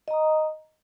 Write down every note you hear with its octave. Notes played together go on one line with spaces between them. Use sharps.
D#5 A#5 D#6